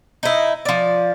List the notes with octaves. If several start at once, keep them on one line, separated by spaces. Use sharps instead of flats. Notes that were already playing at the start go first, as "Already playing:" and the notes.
D#4 E4
F3 D5